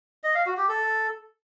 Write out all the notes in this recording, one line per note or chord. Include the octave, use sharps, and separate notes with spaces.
D#5
F5
F#4
G4
A4